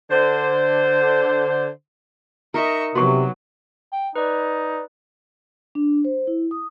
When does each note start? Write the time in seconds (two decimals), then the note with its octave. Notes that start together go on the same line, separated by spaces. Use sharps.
0.10 D3 C5
2.54 D#4 A#4 D#5 E5 C#6
2.95 C3 F#3 B3 F#4 C#6
3.93 G5
4.16 D#4 B4 D5
5.75 D4
6.05 C5
6.27 E4
6.51 D#6